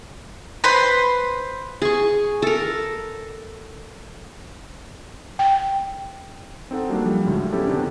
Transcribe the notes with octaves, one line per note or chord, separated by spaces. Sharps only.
B4 C5 B5 C6
G#4 C#6
A4 A#4
G5
C4 D#4 A4 F#5
F#3 G3 A#3 D4
F3 G3
D2 A2 D3 F#3 G#3
B3 C#4 E4 G4 A4
C3 D#3 B3 D4